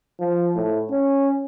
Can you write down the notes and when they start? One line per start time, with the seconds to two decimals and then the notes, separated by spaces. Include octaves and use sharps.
0.20 F3
0.56 A2
0.91 C#4